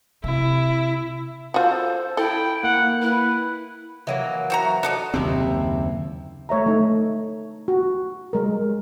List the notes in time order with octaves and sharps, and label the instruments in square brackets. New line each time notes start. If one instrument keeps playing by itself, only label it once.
[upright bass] C3 [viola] E4
[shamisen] F4 F#4 [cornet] A4 [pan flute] C5
[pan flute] E4 [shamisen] A4 [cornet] G5
[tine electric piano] A#3 [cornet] F#5
[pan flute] E4 [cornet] B4
[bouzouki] E3 F#3 A#3
[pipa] C4 F#4 A#5
[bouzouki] D#4 [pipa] F#4 A4 D5
[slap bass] F#1 D#2 C4 [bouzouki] C3 E4
[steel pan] A3 C#5 E5 A#5
A3 D#4
F#4
G3 G#3 A#4